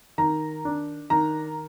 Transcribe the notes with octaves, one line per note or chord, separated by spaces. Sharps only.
D#3 A#5
D4
D#3 A#5